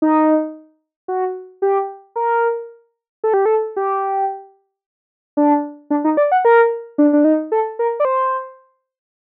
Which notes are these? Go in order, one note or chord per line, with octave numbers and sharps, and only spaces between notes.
D#4
F#4
G4
A#4
A4
G4
A4
G4
D4
D4
D#4
D5
F#5
A#4
D4
D4
D#4
A4
A#4
D5
C5